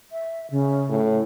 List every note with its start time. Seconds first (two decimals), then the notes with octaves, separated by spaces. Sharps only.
0.12 E5
0.51 C#3
0.89 A2